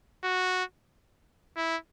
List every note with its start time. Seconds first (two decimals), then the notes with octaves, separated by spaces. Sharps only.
0.24 F#4
1.57 E4